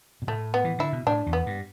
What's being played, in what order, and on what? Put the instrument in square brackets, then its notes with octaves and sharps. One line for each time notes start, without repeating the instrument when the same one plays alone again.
[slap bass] B2
[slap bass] A2 [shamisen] A3
[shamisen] B3
[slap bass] E3
[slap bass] D3 [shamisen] E4
[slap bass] B2
[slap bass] A2 [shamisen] D4
[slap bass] E2
[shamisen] B3
[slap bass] G2